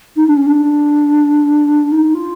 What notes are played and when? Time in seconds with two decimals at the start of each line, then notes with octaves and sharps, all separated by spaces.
0.16 D#4
0.27 D4
0.36 C#4
0.46 D4
1.92 D#4
2.14 F4